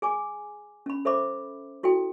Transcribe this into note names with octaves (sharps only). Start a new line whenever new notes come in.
G#4 G#5 D6
C#4 B5
A4 C5 E5 B5 D6
E4 F#4 A4 G5